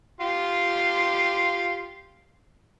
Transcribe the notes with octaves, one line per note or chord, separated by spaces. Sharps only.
F4 G4 C6